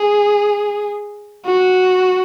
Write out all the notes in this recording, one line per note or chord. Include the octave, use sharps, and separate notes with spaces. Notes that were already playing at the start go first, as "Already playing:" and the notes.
Already playing: G#4
F#4